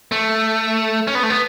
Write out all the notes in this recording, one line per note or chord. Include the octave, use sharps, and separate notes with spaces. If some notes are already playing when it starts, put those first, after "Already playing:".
A3
C#4
B3
A3
B3